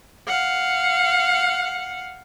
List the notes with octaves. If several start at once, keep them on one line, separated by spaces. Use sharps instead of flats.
F5 F#5